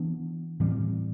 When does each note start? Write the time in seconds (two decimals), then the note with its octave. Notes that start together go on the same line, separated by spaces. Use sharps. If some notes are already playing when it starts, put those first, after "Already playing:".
Already playing: E3 B3 D4
0.60 A2 E3 G3 C4